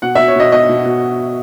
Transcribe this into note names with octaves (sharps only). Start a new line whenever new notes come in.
B2 F#5
B2 E5
C#5
B2 D#5
B2 D#5
B2
B2